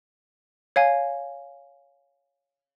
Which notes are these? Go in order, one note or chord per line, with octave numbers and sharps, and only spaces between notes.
C#5 F5 G#5